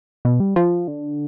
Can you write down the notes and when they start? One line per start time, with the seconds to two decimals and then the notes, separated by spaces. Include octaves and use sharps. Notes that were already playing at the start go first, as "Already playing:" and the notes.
0.25 B2
0.40 G3
0.56 F3
0.88 D3